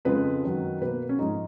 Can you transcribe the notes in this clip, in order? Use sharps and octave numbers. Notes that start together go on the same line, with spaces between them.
F2 C#3 F3 G#3 B4
F#2 D#3 F#3
B2 A#3 B4
C#4
G#2 F3 G#3 D#4